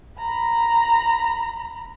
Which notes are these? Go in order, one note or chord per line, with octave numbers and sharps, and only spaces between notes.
A#5 B5